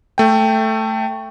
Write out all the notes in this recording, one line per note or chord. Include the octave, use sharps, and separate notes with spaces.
A3 G5